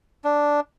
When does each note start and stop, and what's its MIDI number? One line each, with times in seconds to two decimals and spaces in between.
0.24 0.60 62